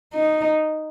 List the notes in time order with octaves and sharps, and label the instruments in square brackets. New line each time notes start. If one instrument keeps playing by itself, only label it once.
[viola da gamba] D#4